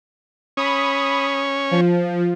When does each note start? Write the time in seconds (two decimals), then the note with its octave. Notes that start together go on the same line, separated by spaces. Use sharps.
0.57 C#4 B5 D#6
1.71 F3